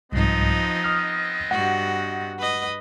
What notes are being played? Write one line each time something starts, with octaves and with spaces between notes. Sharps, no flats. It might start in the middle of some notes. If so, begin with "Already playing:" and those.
C2 G#2 F3 B3 C4 D#4 D#5
D#6 F6
G2 F#4 F#5
B4 D#5